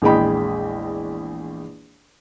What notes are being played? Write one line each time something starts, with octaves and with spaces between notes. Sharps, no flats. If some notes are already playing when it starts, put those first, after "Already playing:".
A#1 E2 G#3 D#5 G5 B5